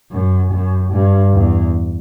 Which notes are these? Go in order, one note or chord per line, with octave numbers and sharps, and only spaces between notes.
F#2
F#2
G2
E2